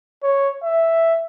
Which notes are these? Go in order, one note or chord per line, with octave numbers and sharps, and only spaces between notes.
C#5
E5